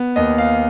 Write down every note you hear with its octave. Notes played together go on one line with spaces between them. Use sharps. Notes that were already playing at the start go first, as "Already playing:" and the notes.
Already playing: B3
D#2 D#5
F5